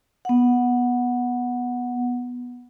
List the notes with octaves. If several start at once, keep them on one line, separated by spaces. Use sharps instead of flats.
B3 F#5